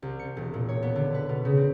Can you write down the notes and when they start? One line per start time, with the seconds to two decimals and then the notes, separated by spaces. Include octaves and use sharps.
0.02 C2
0.19 C#7
0.37 E1
0.54 A#2
0.69 C#5
0.83 B3
0.96 D3
1.14 B4
1.29 B2
1.45 C#3
1.57 C4